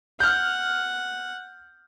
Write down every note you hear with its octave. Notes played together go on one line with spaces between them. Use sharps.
F#5 F6 G6